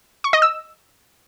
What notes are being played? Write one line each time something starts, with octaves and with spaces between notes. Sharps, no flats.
C#6
D#5
E6